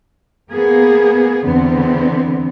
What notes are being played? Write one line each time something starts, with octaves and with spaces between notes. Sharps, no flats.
A#3 B3 G#4
E2 D3 B3 C4